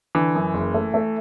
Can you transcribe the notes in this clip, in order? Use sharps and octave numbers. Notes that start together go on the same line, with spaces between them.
D3 E3
F#2
F#1
A3
A3